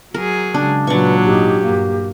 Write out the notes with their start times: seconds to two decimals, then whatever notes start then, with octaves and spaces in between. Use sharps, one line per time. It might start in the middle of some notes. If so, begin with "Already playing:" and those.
0.14 F#3 G#4 A#4
0.54 C#3 G#3 D4
0.87 A#2 F#3 D4 B4 C#6
1.25 G#1 D#4 G4
1.61 G2 A#3